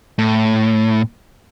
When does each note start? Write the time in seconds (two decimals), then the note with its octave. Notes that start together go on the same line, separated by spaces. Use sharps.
0.18 A2